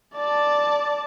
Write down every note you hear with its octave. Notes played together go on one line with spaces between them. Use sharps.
D5 A5